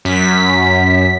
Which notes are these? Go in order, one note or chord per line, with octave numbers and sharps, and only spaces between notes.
F#2 B6